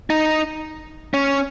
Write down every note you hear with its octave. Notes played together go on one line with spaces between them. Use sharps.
D#4
C#4